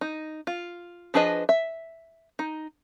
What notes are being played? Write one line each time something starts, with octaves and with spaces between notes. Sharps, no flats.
D#4
F4
F3 D4 G#4 B4 D#5
E5
D#4